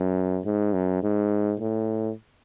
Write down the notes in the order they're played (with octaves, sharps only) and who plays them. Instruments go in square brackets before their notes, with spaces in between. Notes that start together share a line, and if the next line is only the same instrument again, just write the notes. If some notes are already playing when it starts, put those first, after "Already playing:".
Already playing: [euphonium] F#2
G#2
F#2
G#2
A2